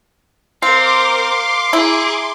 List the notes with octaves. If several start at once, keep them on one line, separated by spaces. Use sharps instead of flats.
C4 A#4 C5 F5 C6 D6
E4 G#4 A#5